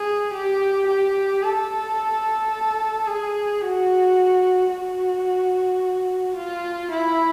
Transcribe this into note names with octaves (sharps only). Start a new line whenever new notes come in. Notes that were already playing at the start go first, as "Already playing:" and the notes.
Already playing: G#4
G4
G4
A4
G#4
F#4
F#4
F4
E4